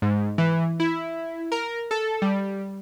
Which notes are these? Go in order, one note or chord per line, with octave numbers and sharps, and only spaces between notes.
G#2
E3
E4
A#4
A4
G3